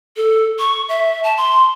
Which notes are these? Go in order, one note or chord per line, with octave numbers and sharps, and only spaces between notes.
A4
C#6
E5
A5
C6